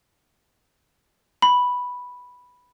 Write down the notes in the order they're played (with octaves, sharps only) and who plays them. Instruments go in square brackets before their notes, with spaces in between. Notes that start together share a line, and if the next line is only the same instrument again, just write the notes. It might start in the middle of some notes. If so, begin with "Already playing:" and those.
[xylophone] B5